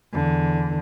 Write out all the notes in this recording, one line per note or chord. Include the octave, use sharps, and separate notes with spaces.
E2 D3